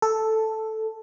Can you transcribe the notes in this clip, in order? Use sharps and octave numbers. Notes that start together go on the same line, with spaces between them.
A4